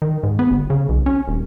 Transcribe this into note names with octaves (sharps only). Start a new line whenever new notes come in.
D#3
G#2
B3
G1
C#3
B1
C#4
D#1